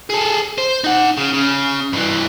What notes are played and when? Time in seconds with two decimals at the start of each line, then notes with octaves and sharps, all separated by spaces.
0.10 G#4 A4
0.58 C5
0.84 D#4 F#5
1.17 C#3
1.34 C#3
1.93 G2 E3